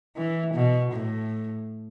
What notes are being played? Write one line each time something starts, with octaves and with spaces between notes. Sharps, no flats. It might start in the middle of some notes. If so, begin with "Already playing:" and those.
E3
B2
A2